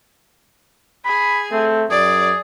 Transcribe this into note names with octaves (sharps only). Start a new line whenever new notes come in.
G#4 B5
A3 C4
F#2 G#4 D5